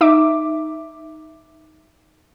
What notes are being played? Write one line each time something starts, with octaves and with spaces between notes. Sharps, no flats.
D#4 E5 D6